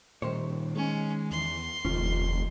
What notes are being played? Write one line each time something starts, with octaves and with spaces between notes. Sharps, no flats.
A#2 D#3 G3 C5 C#5
G#3 C#4
E2 C6
F1 D#2 C#4 F4